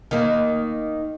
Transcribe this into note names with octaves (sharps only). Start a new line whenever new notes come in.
D#3 A#3